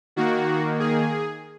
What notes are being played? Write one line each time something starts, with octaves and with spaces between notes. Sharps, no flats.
D#3 A#3 F#4
G#4